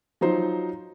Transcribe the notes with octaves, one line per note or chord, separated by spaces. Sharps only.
F3 F#3 D#4 C5